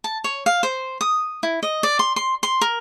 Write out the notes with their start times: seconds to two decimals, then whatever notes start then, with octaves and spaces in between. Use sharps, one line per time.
0.04 A5
0.24 C#5
0.46 F5
0.63 C5
1.01 D#6
1.43 E4
1.63 D#5
1.83 D5
1.99 C6
2.16 C6
2.43 C6
2.61 A#4